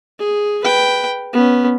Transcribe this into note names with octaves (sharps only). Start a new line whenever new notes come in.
G#4
B4 G5
B3 C#4